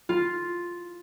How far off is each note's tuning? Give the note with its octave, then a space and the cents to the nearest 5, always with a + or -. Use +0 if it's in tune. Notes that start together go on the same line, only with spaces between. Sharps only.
F4 +0